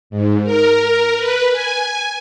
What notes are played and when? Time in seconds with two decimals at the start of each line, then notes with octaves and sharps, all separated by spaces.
0.10 G#2
0.44 A#4
1.17 B4
1.51 G#5